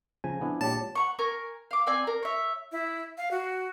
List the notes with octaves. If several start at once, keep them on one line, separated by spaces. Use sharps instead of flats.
C#3 F3 G#5 A#5
B3 D4 E4
A#2 G#3 G4 C#5 A5
F#5 A#5 C#6
A#4 G#5 C#6
F5 D6
C4 D5 G#5
A#4
C#5 E5
E4
F5
F#4